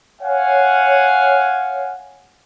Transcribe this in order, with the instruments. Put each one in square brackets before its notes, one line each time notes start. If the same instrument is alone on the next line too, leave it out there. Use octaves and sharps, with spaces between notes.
[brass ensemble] C#5 F5 F#5 G#5